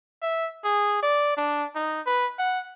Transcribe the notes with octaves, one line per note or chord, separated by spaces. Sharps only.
E5
G#4
D5
D4
D#4
B4
F#5